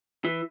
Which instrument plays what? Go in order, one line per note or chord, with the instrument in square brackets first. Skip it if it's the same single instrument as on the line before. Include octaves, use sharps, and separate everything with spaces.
[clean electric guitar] E3